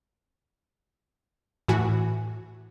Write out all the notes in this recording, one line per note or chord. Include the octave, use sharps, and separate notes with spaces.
A2 E3 F#4 G#5